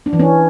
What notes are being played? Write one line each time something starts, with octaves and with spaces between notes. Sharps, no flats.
D4
E3
C#4